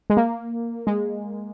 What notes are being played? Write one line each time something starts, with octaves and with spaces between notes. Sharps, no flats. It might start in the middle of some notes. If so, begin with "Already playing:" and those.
G#3
A#3
G#3